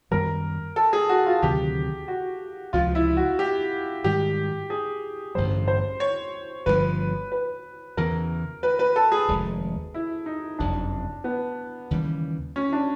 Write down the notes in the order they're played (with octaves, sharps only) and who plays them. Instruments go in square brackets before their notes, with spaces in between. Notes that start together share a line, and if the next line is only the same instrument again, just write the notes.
[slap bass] F#2 D#3 G3 B3 [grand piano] A#4
[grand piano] A4
G#4
F#4
F4
[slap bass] D2 C3 D#3 F#3 [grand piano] G4
[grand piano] F#4
[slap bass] C#2 C3 F3 [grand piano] F4
[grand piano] E4
F#4
G4
[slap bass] G#2 D#3 G3 [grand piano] G4
[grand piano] G#4
[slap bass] A1 G2 D3 G3 [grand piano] C5
[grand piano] C5
C#5
[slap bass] G1 G2 D3 F3 [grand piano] B4
[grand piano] B4
[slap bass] E2 C#3 E3 [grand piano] A#4
[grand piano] B4
B4
A4
G#4
[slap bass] F1 D#2 D#3 G#3
[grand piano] E4
D#4
[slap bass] F#1 F2 C3 F3 [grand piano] D4
[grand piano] B3
[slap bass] D#2 C#3 E3 G3
[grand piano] C#4
D4